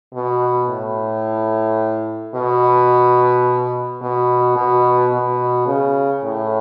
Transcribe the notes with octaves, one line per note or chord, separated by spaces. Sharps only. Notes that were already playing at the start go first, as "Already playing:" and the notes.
B2
A2
B2
B2
B2
B2
C#3
A2